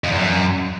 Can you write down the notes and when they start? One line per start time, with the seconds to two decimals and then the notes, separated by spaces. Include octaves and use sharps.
0.04 F2
0.11 E2
0.19 F#2